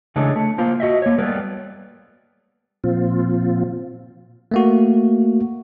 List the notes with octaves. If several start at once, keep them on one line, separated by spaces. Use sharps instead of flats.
C#3 E3 G#3 A3 D4
A3
A#3 F4 C5
F#4 D#5 E5
A#3 C#5
G3 A3 B3 A#4 B4
A#2 F3 C4 F4
A3 A#3 F#4